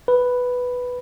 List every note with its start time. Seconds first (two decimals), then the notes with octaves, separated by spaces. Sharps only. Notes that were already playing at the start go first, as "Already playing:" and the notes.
0.08 B4